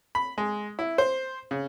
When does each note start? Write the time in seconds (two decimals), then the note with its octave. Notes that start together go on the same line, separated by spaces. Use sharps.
0.15 B5
0.38 G#3
0.79 E4
0.98 C5
1.51 C#3